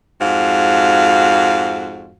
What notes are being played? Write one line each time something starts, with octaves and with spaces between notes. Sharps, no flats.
F2 G#2 F#4 F5